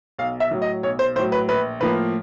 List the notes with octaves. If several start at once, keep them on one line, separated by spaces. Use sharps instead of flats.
B1 F5
E5
A2 F#3
D#5
B1 C#5
C5
A2 F#3 C5
B4
A#1 B4
A2 F3 A#3 B4